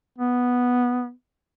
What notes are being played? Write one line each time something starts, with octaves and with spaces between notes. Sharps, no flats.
B3